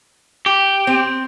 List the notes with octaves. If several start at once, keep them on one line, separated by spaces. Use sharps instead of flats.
G4
C4